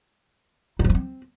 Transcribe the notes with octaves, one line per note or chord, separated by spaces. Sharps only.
D#4
F3
D#4
C4